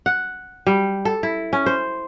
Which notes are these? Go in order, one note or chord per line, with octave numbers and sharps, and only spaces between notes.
F#5
G3
A4
E4
C#4
C5